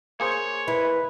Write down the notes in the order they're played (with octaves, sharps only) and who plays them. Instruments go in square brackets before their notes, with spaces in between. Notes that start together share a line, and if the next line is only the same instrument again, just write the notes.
[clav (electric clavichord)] A#3 G#4 C5 [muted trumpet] C#5
[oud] E4 [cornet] B4